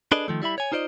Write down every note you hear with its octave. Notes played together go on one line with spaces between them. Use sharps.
D4 G#4 A4 B4 D5 D#5
D#3 F3 A3
G3 E4 E5 B5
C#5 G#5
D#4 F4 C5 D5 D#5